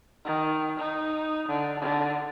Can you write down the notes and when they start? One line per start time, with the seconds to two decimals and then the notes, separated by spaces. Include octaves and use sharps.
0.25 D#3
0.78 D#4
1.48 D3
1.79 D3